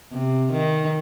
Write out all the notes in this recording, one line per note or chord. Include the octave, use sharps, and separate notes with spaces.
C3
D#3